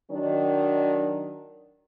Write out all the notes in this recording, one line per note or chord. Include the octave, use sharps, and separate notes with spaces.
D#3 F#3 D4